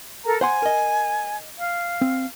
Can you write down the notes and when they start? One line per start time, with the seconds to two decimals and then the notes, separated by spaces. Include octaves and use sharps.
0.24 A4 A#4 A#5
0.41 C5 F#5 G#5 C6
0.62 A#4 D#5
1.58 F5
2.01 C4